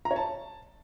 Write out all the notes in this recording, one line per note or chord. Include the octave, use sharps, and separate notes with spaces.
A#5
C#5
A5